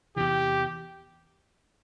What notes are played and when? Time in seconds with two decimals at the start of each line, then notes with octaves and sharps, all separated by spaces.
0.16 E2 C3 E3 G4